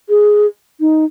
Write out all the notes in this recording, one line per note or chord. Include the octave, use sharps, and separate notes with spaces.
G#4
D#4